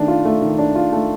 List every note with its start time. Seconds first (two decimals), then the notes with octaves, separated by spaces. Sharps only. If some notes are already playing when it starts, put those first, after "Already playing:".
Already playing: D#3 A3 D4
0.08 F4
0.25 A3
0.42 D#3
0.58 D4
0.75 F4
0.92 A3